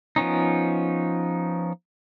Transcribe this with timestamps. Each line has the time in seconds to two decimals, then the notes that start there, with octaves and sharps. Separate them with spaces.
0.16 F3 B3 C#4 D#4